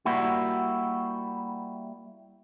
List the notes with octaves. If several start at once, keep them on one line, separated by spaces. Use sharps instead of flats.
G3 A#3 E4 F#4